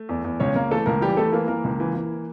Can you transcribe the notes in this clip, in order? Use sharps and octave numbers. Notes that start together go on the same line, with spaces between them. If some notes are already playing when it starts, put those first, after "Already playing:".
Already playing: A3
E2
E2
C#2 C#4 C#5
C#2 A#3 A#4
E3 A3 A4
C#2 A#3 A#4
E3 G3 G4
E3 A3 A4
E3 A#3 A#4
E3 A#3 A#4
C#2
E3
E3